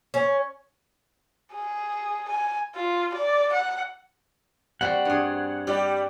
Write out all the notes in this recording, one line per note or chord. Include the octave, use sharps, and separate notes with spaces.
C#4
G#4
G#5
F4
D5
F#5
G3 C4 F#4 F#5
G2 G#4
G3 G4 D5